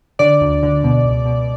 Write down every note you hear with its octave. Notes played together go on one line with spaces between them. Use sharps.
D3 D5
D2
D3
B2
C#2
B2